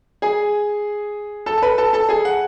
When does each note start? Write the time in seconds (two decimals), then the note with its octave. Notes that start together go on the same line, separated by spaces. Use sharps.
0.22 G#4 G#5
1.46 A4 A5
1.57 A5
1.62 B4 B5
1.78 A4 A5
1.93 A4 A5
2.09 G#4 G#5
2.25 F#5